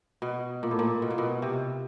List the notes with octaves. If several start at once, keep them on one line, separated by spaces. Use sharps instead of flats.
B2
A#2
A2
A#2
B2
A#2
B2
C3